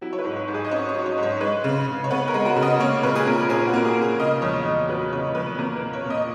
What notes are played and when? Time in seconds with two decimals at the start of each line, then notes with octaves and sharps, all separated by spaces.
0.01 F#3 E4
0.13 C#5
0.19 B4
0.24 G#2
0.36 C#5
0.48 G#2
0.54 G#4
0.64 D#5
0.71 C#4 C#5
0.89 C#5
0.94 F#3
1.06 C#5
1.18 G#2
1.23 C#5
1.41 G#3 B4
1.64 C#3
1.87 C#3
2.04 C#5
2.11 B3 B4
2.28 A#4
2.34 G#3
2.45 F#4
2.56 C#3
2.63 D#5
2.80 A#3 C#5
3.03 A#2 B4
3.15 G#4
3.26 A#2 A#4
3.49 C#4 G#4
3.67 F#4
3.73 A#3 A#4
3.85 G#4
3.96 A#2
4.02 G#4
4.19 C#3 D#5
4.42 E2 C#5
4.65 E2
4.88 F#3 B4
5.13 C#3 C#5
5.35 E2 B4
5.58 A#3 A#4
5.76 A#2 B4
5.93 C#5
6.05 A#2
6.10 D#5